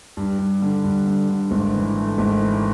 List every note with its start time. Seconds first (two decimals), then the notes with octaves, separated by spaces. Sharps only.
0.17 G2
0.39 G2
0.62 D3
0.84 G2
1.07 D3
1.29 D3
1.51 G#1
1.74 E3
1.97 A3
2.18 G#1
2.42 E3